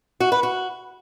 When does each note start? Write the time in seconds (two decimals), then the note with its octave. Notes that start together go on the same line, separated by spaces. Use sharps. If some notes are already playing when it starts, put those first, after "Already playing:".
0.20 F#4
0.32 B4
0.43 F#4